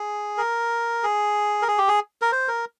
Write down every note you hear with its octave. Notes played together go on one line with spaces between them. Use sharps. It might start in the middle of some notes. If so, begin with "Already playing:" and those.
Already playing: G#4
A#4
G#4
A#4
G#4
G4
G#4
A#4
C5
A#4